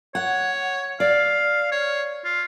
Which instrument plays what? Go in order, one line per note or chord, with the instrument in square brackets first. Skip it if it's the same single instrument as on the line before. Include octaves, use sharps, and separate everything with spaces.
[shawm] C#5 [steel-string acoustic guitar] F#5
[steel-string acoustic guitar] D5 [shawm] F5
[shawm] C#5
F4